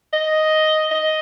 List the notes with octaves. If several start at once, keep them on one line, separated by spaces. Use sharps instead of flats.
D#5
D#5